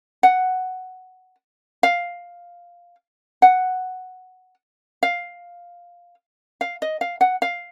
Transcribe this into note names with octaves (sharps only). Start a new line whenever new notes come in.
F#5
F5
F#5
F5
F5
D#5
F5
F#5
F5